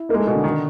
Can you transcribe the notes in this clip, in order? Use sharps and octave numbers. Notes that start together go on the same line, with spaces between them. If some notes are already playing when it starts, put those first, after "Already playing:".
Already playing: E4
G#3 A#3 D#4
A3
B2 G#3
D3
D#3